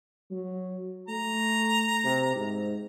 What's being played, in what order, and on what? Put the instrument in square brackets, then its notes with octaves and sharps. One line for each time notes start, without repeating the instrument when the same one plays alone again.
[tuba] F#3
[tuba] A3 [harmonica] A#5
[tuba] C3
G#2